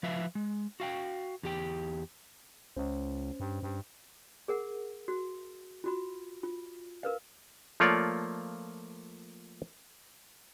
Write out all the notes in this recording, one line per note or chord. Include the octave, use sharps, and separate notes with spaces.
F3 B4 E5 F5
G#3
F#4 F5 G5
E2 G4 G5
C#2 C#4 C5
G2
G2
G#4 A#4 F#5
F#4
F4 F#4 B5
F4
A#4 B4 F5
F3 A3 A#3 F4 C#5 D5